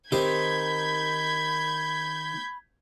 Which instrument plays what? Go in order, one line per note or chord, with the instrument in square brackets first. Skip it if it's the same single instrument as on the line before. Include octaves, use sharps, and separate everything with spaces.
[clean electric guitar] D#3 [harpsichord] C4 G4 C5 [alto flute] B5 [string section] G6 G#6 B6